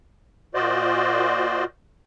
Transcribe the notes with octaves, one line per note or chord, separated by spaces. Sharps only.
A#2 F4 F#4 C5 D5 D#5